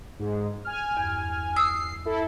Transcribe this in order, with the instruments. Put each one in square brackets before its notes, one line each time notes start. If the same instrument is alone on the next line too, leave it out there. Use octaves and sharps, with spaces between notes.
[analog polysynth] G#2 G#3
G#5 F6
[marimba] E2 G2
[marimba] D#6 E6 [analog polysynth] C7
[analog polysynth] E4 A4